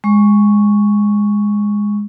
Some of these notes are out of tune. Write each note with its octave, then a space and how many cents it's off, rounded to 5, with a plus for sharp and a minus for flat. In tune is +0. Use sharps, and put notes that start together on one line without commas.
G#3 -10 C#6 +0